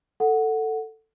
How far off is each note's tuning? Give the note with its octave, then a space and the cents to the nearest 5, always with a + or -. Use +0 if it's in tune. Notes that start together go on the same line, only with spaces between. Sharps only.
A4 +10 F#5 -5